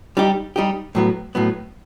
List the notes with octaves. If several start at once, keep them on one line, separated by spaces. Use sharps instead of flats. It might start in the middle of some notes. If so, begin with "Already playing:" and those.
G3 D#4 G4
G3 D#4 G4
A2 F#3 B3
A2 F#3 B3